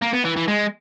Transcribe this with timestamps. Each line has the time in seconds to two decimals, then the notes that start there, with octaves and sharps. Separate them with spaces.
0.02 A#3
0.13 B3
0.25 E3
0.36 E3
0.48 G#3